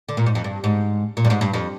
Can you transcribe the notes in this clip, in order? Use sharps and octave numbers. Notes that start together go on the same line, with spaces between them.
D3
A#2
G#2
F2
G2
G#2
A#2
G2
G#2
G2
F2